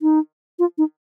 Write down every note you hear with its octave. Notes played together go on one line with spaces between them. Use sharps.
D#4
F4
D#4